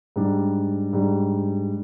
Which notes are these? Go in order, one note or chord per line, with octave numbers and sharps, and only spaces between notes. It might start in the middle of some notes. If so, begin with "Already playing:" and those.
G#2 G3 D4
G#2 G3 D4